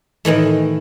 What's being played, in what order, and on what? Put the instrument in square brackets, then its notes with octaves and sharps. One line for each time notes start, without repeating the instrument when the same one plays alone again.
[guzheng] A2 D#3 E3 A3